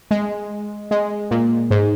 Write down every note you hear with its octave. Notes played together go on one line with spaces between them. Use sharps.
G#3
G#3
A#2
G#2